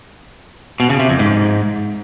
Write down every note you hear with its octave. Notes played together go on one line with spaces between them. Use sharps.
B2
C#3
C3
F2
G#2